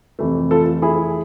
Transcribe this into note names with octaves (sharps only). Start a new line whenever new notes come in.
F2 C3 E3 A3
F4 A4
E4 G#4